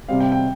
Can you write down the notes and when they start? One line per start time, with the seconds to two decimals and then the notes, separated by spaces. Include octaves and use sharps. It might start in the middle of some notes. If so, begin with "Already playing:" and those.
0.08 C3 G3 C4 F5
0.20 G5
0.32 G5